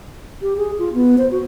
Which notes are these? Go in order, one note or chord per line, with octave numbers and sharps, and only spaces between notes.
G4
G#4
F4
B3
C5
F#4